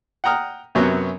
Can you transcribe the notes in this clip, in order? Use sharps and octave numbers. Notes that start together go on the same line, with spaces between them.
F#5 G5 A#5 D#6 F6
F#2 C3 F#3 B3 C#4